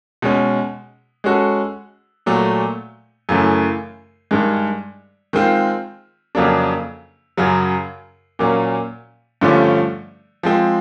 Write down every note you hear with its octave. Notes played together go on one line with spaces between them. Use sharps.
B2 G#3 C#4
G#3 C#4 F#4 A4
A#2 F#3 A3
F#2 C#3 E3 A3
G2 D#3 G#3
D#3 G#3 C4 F4
F2 C#3 F#3 A#3 D4
F#2 C#3 F#3
A#2 F#3 A#3 C#4
G2 D3 F3 A3 C#4
F3 G#3 C4